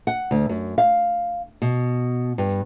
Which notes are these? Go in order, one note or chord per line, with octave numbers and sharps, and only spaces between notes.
F#5
D2
F#2
F5
B2
G2